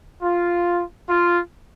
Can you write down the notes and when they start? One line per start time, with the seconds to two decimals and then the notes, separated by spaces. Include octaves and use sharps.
0.22 F4
1.09 F4